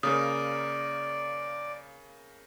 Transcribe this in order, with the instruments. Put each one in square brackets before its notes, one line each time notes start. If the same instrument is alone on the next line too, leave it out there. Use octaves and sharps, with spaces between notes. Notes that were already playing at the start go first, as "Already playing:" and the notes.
[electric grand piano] C#3 A#3 A#4 [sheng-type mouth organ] D5 [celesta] D#6